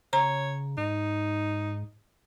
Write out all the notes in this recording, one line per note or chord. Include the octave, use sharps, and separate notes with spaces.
C#3 C#5 A#5
G#2 D#4